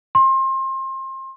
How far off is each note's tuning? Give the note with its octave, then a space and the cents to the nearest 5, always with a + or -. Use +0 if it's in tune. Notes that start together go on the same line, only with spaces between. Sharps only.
C6 +30